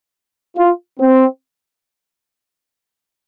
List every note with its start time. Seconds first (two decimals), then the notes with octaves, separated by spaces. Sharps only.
0.57 F4
1.00 C4